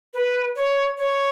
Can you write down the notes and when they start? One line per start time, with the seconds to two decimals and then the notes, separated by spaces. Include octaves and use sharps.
0.14 B4
0.56 C#5
0.98 C#5